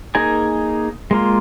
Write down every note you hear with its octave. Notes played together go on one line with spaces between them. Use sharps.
A#3 D#4 G#4 A#4 G#5
G#3 A#3 F4